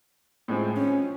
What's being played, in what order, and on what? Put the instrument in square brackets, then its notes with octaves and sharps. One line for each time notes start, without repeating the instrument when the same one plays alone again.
[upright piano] A2 F3 G#3 C4
[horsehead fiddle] C#4